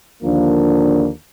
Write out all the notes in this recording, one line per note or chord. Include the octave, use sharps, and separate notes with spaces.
D#2 D3 F3 A#3 D4